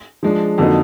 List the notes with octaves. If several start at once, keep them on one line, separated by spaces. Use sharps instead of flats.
F3 G#3 D4
F2 D3 F#3 A#3 D#4